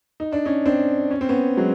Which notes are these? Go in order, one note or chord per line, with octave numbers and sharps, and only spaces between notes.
D#4
D4
C#4 D#4
C4 D4
C#4
C4
B3 C#4
F#3 G#3